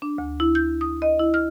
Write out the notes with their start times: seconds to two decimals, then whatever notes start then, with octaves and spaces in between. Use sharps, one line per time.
0.02 D4
0.18 D2
0.40 E4
0.55 G6
0.81 D#6
1.02 D#5
1.19 E4
1.34 F6